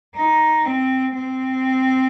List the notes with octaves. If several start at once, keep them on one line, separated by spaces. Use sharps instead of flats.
D#4
C4
C4